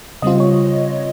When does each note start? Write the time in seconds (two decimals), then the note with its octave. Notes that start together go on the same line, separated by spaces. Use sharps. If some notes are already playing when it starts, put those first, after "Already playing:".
0.22 C#3 G3 C4 F4 D#5
0.40 C#5